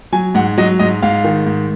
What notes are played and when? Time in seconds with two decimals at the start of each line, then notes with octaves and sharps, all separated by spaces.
0.12 F#3 G#5
0.35 G#2 F#5
0.58 F#3 D#5
0.79 G#2 D#5
1.02 G#2 F5
1.24 D#3
1.46 G#2